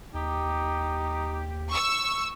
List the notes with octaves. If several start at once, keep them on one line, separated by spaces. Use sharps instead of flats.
D#2 D#4 G4
C#6 E6